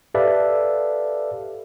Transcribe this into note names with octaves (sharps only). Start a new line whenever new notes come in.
G4 A4 B4 D5 E5 F5